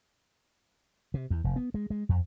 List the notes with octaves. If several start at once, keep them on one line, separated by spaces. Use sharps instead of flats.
C3
E2
F1
B3
G#3
G#3
F2